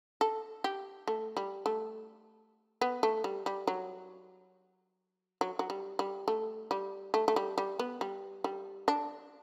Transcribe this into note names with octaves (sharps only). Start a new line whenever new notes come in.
A4
G4
A3
G3
A3
B3
A3
G3
G3
F#3
F#3
F#3
G3
G3
A3
G3
A3
A3
G3
G3
B3
G3
G3
D4